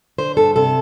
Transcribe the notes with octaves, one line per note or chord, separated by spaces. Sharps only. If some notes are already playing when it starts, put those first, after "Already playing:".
D3 C5
G2 A4
C3 A4